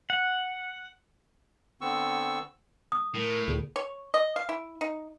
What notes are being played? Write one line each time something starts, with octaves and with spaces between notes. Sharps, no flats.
F#5
D3 B3 C4 C#6 E6
D#6
A2 A#4
D2 A#2 G#4
C#5
D#5
F5
E4
D#4